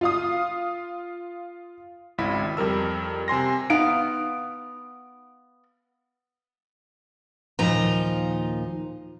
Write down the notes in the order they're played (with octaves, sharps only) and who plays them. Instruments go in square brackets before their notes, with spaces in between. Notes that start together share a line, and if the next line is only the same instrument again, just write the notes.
[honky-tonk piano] F4 F5 D#6
[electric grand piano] G#1 C#2 E4 B5 B6
F2 G3 A#4 E6
C3 G#5 C6 A#6
[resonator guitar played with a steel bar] B3 F5 [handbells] D#4 D7
[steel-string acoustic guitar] D#2 A#2 F3 D#4 F4 A#5